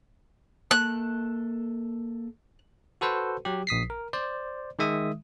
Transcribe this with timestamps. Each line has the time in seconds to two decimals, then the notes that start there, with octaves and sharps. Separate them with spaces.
0.71 A#3 A4 A5 F#6
3.01 F#4 A4 B4 C5
3.45 F#3 G4
3.67 A#1 D#6 B6 C7
3.90 A#4
4.13 C5 D5
4.79 D#3 G#3 E5 D#6